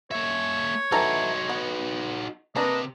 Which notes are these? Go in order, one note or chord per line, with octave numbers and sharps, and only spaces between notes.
A#3 C#5 E5
E3 D#4 F#4 A4 A#5
B3
C3 A#3 D4 B4 D#5